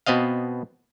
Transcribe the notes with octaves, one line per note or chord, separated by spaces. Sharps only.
B2 B3 C4 D#5 F5